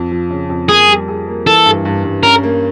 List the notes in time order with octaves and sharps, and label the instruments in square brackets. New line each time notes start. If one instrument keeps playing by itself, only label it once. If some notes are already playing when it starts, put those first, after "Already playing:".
Already playing: [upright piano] F2
F3
C#3
F2
[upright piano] A#3 [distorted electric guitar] G#4
[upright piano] G3
G#4
A#3
[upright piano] E3 [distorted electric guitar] A4
[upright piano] G2
G2
G2
[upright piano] C#4 [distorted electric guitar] A#4
[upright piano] A#3